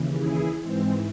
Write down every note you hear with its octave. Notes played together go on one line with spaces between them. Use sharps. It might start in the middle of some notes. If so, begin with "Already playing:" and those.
Already playing: D#2 C#3 E3
E4 G#4
G#2 E3 G#3 C4